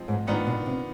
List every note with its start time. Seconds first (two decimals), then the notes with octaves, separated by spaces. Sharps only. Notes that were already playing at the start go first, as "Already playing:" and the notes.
Already playing: F3 G#3 C4 D#4
0.08 G#2
0.27 G#2 D#3 B3 D4 F4
0.47 B2
0.66 C3